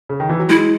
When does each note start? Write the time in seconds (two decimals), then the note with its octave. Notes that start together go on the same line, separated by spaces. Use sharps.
0.09 C#3
0.20 D#3
0.29 E3
0.39 F#3
0.49 G#3 E4